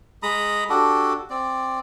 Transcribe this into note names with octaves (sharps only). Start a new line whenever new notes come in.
G#3 A#5 B5 D#6
D4 F#4 G4 A4
C4 D5